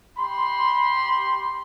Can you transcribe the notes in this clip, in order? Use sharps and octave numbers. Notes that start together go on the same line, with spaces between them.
G4 B5 C6